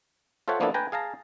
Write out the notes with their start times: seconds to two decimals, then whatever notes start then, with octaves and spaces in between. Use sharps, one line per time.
0.48 F4 A4 C5 C#5 E5 F#5
0.60 F3 A#3 B3 D4 E4 A4
0.74 B4 G5 G#5 A#5
0.92 G#4 F5 A5 A#5